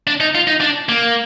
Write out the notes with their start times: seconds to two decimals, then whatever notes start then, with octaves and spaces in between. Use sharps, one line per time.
0.07 D4
0.20 D#4
0.35 F4
0.47 D#4
0.61 D4
0.89 A#3